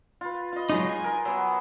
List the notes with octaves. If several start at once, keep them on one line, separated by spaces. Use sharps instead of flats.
F4 B4
F4 D#5
F#3 G#3 D#4
G#5
A#4
F#3 B3